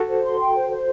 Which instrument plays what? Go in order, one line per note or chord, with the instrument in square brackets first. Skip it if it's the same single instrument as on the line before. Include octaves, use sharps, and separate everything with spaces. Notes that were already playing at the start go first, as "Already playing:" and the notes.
Already playing: [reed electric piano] F#4 A4
[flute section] C5
C6
G5
C5
C5